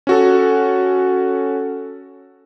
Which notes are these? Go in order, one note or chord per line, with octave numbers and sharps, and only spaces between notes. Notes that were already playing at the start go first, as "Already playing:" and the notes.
C#4 F#4 A4